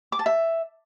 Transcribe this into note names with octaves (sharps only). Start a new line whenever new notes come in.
D6
A5
E5